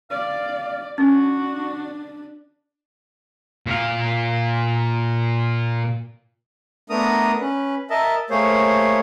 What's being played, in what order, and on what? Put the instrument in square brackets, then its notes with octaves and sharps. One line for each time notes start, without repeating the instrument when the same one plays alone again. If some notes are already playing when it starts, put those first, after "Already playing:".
[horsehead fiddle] D5 [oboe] F5
[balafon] C#4 [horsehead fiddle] D4 [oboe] F#4
[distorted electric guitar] A#2 F5
[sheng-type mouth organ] A3 B3 D4 A#4 A#5 D#6
C#4 B4
A#4 D#5 E5 A5
A3 A#3 G#4 C5 C#5